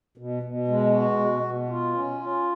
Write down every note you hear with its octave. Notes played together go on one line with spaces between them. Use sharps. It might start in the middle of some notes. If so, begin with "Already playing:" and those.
B2
B2
G#3
F#4
B2
B2
F4
C#4
F4